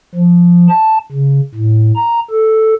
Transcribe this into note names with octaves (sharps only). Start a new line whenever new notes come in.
F3
A5
C#3
A2
A#5
A4